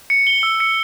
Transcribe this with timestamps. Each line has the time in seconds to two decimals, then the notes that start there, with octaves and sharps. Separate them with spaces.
0.10 C#7
0.27 G7
0.43 E6
0.60 C#7